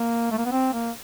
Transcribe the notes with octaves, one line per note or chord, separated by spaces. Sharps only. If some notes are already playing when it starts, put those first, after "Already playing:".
Already playing: A#3
A3
A#3
B3
C4
A#3